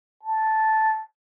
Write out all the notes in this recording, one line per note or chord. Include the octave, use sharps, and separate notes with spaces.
A5